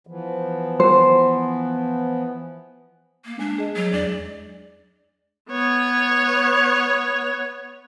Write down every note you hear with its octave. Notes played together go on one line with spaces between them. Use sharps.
E3 F3 B3
C5
A#3
G#3 D4
G#4 D#5
F#3
E2 D4 D5
B3 C#5